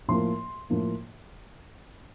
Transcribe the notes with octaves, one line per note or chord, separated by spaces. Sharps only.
A2 F3 A#3 C6
A2 F3 A#3